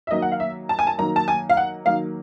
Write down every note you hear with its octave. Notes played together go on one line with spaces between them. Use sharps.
E5
D#3 F#3 A#3 D#5
F#5
F5
E5
A5
G#5
A5
D#3 F#3 A#3 A#5
A5
G#5
F5
F#5
D#3 F#3 A#3 F5